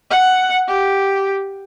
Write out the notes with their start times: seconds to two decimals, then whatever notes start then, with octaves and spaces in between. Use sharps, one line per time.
0.10 F#5
0.68 G4